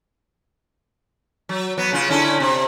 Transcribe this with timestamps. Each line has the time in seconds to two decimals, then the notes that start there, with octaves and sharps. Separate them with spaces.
1.49 F#3
1.78 F#3 B3
1.92 C#3 F4
2.10 D3 C#4 E4
2.40 C3